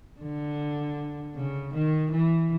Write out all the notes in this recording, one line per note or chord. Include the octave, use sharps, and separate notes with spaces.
D3
C#3
D#3
E3